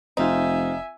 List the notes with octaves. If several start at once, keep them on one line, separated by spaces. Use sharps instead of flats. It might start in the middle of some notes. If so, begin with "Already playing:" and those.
F1 C4 D#4 F4 E5 G#5